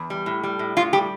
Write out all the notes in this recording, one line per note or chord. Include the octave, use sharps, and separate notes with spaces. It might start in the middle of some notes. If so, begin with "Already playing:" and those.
Already playing: E2
G3
A2
G3
A2
A2 F4
G3 G4